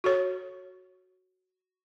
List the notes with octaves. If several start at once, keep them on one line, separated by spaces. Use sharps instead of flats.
F#4 A4 C#5